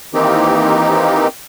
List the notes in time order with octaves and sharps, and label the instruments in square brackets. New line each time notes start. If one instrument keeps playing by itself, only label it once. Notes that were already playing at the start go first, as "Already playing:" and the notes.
[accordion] D#3 E3 A#3 C4 D#4 G4